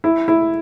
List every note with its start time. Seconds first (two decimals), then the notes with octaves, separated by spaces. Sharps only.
0.04 E4
0.28 E4